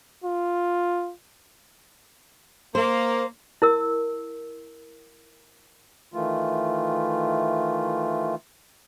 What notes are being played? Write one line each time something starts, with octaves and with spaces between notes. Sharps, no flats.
F4
A#3 C5
E4 A#4 E6
D#3 E3 A3 F4